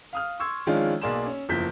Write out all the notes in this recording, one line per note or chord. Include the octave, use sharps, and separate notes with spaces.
F5 D#6 F6
C6 C#6 E6 G#6
D#3 F3 G#3 C#4 D4 F4
B1 A#3 G#4 D5 C6 E7
C#4
F#1 E2 F3 G6 B6